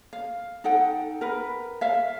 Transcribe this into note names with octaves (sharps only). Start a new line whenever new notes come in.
F5
D#4 A4 F#5 G5
A#4 B4
E5 F5